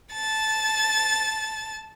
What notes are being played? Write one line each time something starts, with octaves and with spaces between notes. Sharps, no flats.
A5 A6